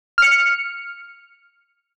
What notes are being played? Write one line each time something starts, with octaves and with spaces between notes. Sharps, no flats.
F6 C#7